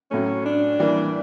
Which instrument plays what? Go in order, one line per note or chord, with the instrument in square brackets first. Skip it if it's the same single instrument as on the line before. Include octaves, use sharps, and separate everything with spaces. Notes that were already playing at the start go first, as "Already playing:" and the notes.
[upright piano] A2 F#3 A3 [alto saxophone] C#4
[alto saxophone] D4
[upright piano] E3 G3 A#3